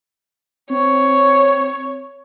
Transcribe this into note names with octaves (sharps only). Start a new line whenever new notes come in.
C4 C#5